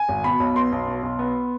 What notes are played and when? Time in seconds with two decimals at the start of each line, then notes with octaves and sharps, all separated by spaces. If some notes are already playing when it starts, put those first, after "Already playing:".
Already playing: G#5
0.09 G#1
0.24 B2 B5
0.40 B1
0.56 B3 C6
0.72 B1
0.87 B2
1.03 B1
1.19 B3